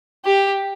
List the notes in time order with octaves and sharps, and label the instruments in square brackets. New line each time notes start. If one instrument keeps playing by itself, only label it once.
[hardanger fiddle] G4